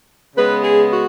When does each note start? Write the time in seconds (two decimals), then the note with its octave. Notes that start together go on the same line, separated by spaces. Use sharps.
0.36 C#3 G#3 B3 B4
0.64 G#4
0.93 F#4